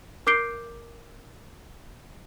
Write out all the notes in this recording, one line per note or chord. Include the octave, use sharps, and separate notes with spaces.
A#4 D6 G6 C7 D7 G7